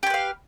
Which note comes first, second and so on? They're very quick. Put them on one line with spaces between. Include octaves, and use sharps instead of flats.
G4 C#5 B4 F5